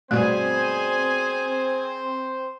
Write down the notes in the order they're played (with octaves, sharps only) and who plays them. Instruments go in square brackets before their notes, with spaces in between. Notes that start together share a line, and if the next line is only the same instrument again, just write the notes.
[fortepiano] G2 B2 G3 [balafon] A3 [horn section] C4 C5 [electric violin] G#4 G#5